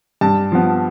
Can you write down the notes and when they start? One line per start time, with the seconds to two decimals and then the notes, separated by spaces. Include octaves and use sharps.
0.21 G2 A5
0.52 F3 B3